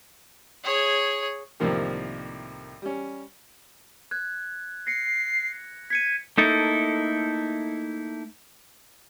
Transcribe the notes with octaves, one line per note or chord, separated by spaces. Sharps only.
G#4 C#5
C2 A2 D#3 F3 A#3 G4
G3 C#4
F#6 G#6
A#6 C7 C#7
G#6 B6 C#7 D#7
A3 A#3 D#4 E4 A4